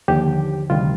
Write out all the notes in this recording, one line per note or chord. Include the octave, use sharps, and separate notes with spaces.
D#2 D3 F3 G4
D2 C3 D#3 G3 F4